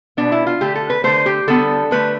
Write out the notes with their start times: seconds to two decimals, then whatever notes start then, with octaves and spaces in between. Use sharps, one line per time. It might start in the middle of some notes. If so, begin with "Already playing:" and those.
0.17 B2 B3 D4
0.32 E4
0.47 F4
0.61 D3 A3 G4
0.75 A4
0.90 B4
1.04 D3 A3 C5
1.26 G4
1.48 D3 G3 B3 A4
1.91 D3 A3 B4